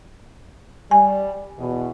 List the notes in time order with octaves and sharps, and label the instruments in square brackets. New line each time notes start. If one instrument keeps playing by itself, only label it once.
[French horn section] G3 [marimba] G#5
[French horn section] E2 B2